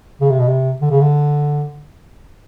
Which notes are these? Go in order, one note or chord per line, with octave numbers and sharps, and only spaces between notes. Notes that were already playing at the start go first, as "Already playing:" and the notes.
C#3
C3
B2
C3
D3
C#3
D3